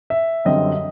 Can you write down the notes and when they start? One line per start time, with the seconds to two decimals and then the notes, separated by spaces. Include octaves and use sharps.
0.10 E5
0.45 F#2 D3 G3 C4 D#5